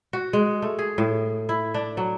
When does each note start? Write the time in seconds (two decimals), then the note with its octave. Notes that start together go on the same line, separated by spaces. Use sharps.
0.13 F#4
0.33 G#3
0.62 A3
0.79 G#4
0.98 A2
1.49 E4
1.74 D4
1.97 F#3